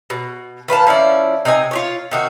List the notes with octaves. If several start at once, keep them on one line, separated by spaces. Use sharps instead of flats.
B2
D#3 B4 F5 A5
F3 C#4 E4 D5
C3 D#4 D#5 G#5
F4 G4 C#5
C3 D#3 F#4